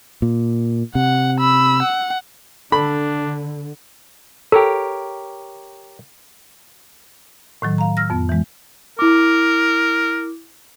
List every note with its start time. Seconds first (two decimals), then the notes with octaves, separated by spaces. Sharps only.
0.22 A#2
0.95 C3 F#5
1.40 B5 E6
1.83 F#5
2.72 D3 D4 A4 B5
4.52 G4 A4 A#4 C#5
7.62 A2 D#3 F#3
7.78 F5 A#5
7.97 E6 F6 A#6
8.10 F2 B3
8.29 E3 G#3
8.99 E4 A#4 D6